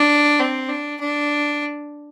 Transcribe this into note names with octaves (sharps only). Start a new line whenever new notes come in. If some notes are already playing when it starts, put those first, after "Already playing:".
Already playing: D4
C4
D4
D4